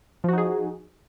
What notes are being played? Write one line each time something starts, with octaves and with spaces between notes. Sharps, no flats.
F3 D#4 F#4 G#4